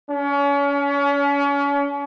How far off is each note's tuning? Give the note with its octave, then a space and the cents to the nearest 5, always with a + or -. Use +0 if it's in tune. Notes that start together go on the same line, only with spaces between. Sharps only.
C#4 +35